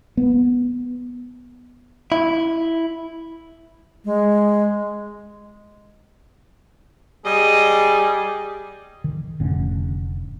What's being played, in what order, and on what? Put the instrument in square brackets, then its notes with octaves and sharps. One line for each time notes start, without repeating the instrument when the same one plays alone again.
[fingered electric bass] B3
[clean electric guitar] E4
[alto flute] G#3
[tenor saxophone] G3 [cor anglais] G#4 [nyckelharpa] D#5
[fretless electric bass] D#3
F1 A2 D3 C#4